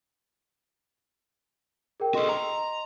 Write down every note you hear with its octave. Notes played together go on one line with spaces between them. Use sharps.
G#4 A#4 G5
F#4 A4 D#5 C6
A#5